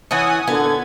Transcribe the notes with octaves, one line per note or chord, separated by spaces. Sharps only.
E3 C#4 F#5 G#5 D#6
A#2 D3 B3 G#6